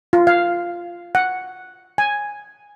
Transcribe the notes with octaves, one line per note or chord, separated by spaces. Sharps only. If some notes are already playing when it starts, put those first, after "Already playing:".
F4
F5
F#5
G#5